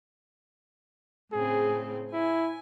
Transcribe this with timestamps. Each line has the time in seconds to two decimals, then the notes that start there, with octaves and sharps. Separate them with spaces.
1.32 A2 C#3 C4 G#4
2.13 E4 G#5